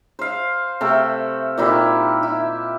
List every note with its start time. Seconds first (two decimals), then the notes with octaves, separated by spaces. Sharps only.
0.19 C5 F5
0.81 C3 A3 A4 G5
1.58 A#2 D#3 E4 G4
2.23 E4